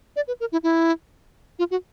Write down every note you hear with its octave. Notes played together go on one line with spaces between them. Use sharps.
D5
B4
A#4
E4
E4
F4
F#4